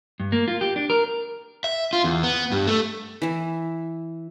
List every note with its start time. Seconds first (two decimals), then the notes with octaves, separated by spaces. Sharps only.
0.20 G2
0.32 A#3
0.48 F4
0.61 G4
0.76 D4
0.90 A#4
1.64 E5
1.93 F4
2.04 E2
2.23 B3
2.52 G2
2.67 A3
3.22 E3 E4